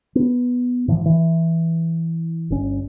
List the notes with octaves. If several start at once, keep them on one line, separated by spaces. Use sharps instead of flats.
B3
G#2 E3 F3
E3
G1 C#4